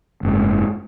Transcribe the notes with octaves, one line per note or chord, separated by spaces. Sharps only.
F#1 G#2